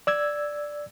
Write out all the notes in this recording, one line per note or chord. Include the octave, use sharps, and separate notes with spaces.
D5 E6 G#6